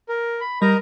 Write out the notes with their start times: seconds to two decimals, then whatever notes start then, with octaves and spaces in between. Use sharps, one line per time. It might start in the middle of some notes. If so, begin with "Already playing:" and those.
0.09 A#4
0.40 B5
0.62 G3 A#4 D#5 A#5 B5